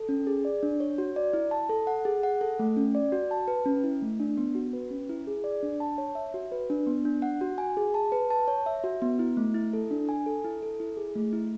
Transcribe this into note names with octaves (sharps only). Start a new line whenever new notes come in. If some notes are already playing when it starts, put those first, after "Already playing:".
Already playing: A4
C#4
G#4
D5
D4
C#5
F#4
D5
E4
A5
A4
F#5
G#4
F#5
A4
A3
C#4
D5
F#4
A5
B4
C#4
E4
A3
D4
B3
F#4
B4
C#4
E4
G#4
D5
D4
A5
C#5
E5
F#4
B4
D4
B3
D4
F#5
F#4
G#5
G#4
A5
B4
A5
C#5
E5
F#4
B3
E4
A3
E4
A4
D4
G#5
A4
E4
A4
E4
G#4
A3
E4